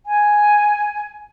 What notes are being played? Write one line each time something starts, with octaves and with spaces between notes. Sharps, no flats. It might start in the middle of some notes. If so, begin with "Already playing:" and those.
G#5